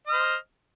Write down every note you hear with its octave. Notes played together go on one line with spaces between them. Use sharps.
C5 D#5 F6